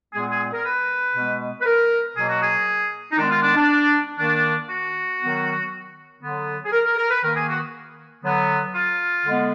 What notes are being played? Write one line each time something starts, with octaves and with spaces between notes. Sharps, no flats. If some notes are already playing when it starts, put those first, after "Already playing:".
A#2 G#3 B3 G#4
G#4
A#4
B4
B2 G#3 B3
B4
A#4
B2 F#3 A#3 G#4
F#4
G#4
D#4
D#3 G#3 B3 D4
F4
D4
D4
D#3 A#3 D4
F#4
D#3 F#3 B3
D3 F#3 B3
G#4
A#4
A#4
A#4
B4
D#3 A#3 A#4
G#4
F#4
D3 F#3 B3
F4
D3 G#3 B3